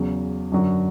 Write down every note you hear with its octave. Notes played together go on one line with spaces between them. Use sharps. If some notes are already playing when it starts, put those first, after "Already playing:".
Already playing: E2 C#3 F#3
F#2 D3 F#3